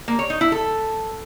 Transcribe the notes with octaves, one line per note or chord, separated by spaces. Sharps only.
A#3
C#5
D#4
E4
A4